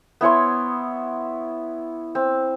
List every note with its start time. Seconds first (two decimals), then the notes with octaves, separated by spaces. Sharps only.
0.21 B3 E4 C#5 C6
2.15 C4